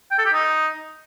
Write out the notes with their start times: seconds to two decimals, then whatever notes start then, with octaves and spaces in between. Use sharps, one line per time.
0.11 G5
0.18 A4
0.26 G4
0.33 D#4